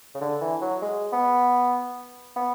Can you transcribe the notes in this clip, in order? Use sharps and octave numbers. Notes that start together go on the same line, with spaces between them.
C#3
D3
E3
F#3
G#3
B3
B3